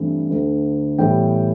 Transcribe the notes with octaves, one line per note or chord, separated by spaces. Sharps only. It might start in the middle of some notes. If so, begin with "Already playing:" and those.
Already playing: G2 E3 A3 C4
D2 D3 A3
A2 E3 G3 B3 G5